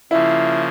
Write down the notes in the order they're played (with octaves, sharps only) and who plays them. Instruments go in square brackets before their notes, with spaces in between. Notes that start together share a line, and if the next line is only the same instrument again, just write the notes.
[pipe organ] C#3 F3 A#3 [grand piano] E4